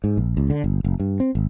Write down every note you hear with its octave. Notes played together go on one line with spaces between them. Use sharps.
G#2
A#1
C#2
D3
G1
F#1
G2
C4
G#1